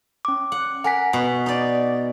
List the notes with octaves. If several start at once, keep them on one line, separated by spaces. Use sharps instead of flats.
C#4 D6
F#5
A#4 F#5 G#5 B6
B2
D#4 D5